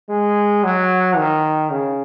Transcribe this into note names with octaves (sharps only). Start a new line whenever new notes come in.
G#3
F#3
D#3
C#3